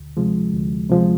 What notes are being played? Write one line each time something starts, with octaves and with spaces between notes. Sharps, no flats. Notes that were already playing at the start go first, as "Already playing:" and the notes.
Already playing: D2
C3 F3 G#3
D2
C3 F3 G#3